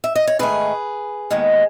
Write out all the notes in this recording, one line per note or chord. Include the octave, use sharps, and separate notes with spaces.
E5
D#5
C#5
G#2 D#3 A3 G#4 B4
D#2 D#3 G#3 B3